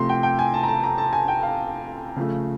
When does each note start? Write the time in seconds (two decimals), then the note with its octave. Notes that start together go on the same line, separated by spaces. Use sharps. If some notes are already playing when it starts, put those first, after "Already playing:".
Already playing: C3 F3 A3 C6
0.09 G5
0.23 G5
0.39 G#5
0.54 A5
0.63 A#5
0.68 A5
0.83 A#5
0.98 A5
1.13 G#5
1.28 G5
1.43 F5
2.16 C#3 F3 A3